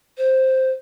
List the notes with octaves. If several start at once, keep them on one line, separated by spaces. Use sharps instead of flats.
C5